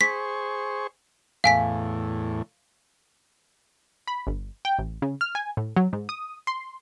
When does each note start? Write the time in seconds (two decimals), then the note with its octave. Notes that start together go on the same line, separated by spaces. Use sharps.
0.01 G#4 C5 C#6 B6
1.44 E2 A2 F5 G#5 B6
4.07 B5
4.27 G1
4.65 G5
4.79 A1
5.02 C#3
5.21 F6
5.35 G#5
5.57 A2
5.76 F#3
5.93 G#2
6.09 D#6
6.47 C6